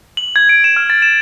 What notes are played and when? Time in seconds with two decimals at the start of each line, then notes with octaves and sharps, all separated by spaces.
0.17 F#7
0.36 G#6
0.49 D7
0.64 E7
0.76 F6
0.90 A6
1.02 E7